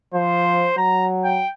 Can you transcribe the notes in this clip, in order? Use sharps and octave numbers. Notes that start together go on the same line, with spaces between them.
F3 C5
F#3 A#5
G5